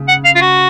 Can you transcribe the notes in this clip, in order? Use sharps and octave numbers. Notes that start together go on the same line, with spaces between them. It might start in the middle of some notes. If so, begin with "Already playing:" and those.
Already playing: C#3
F#5
F5
F4
F#4